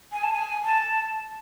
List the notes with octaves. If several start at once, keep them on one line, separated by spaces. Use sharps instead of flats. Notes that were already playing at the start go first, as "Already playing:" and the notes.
G#5
A5
G#5
A5